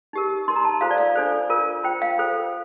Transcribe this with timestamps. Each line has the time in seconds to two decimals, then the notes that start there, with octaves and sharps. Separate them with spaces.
0.13 D#4 G4 A#4
0.48 D#4 A#4 C6
0.56 A#5
0.65 A5
0.81 F4 A4 C5 F5
0.91 D5
0.98 F5
1.16 D4 A4 C5
1.50 F4 A#4
1.84 F4 C5 G5
2.02 F5
2.18 F4 A4 C5